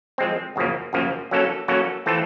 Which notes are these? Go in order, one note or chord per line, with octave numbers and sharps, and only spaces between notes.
F3 G#3 C4
F#2 C#3 F3 A#3
F#2 C#3 F3 A#3
F#3 A#3 C#4 F#4 A4
F#3 A#3 C#4 F#4 A4
E3 A3 C4 F4 A4